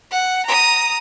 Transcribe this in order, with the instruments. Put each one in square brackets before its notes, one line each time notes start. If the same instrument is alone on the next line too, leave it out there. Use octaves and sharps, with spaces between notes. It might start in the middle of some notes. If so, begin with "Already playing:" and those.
[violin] F#5
A#5 D#6